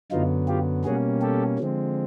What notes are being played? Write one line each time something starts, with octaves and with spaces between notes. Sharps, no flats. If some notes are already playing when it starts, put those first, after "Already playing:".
F#2 D3 F#3 B3 D#4 F4
F4 G4
B2 G3 A#3 C#4 F#4 G#4
G4 A4
D3 F3 G#3 C4